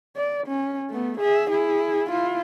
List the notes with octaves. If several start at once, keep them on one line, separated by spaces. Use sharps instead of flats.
D5
C#4
A3 B3
G#4 E5
E4 G#4
E4 F4